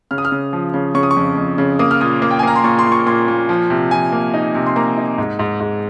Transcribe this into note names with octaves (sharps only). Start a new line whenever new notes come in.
C#3 F6
D#6
F6
C#3
F3
C#3
C#3 C#6
D#6
C#6
F2
F2
C#3
A#3 D#6
F6
A#2 D#6
A#3
G5
G#5
A#3 A#5
C6
A#2 C#6
C6
A#2
C#6
A#2 C6
A#2
F3
C3
F3 G#5
A#3
D#4
C3
C6
A#3 A#5
D#4
G#2
G#2
G#2